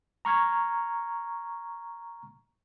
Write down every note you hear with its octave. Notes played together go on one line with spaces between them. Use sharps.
A#5 C#6 F6 G#6 A#6